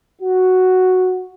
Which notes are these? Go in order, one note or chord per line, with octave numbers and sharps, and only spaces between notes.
F#4